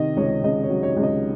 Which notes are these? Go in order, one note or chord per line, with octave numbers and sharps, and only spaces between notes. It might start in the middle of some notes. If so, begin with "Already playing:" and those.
Already playing: C3 D#3 D#5
C#2 C#5
C#2 D#5
C#5
F#3
C#5
C#2
D#5